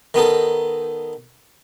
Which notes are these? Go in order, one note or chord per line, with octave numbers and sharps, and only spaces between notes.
D#3 B3 D#4 A4